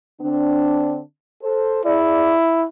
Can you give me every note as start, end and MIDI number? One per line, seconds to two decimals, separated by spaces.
0.22 1.01 50
0.22 1.01 60
0.22 1.01 62
1.43 1.80 69
1.43 1.80 72
1.85 2.67 64
1.85 2.36 68
1.85 2.36 74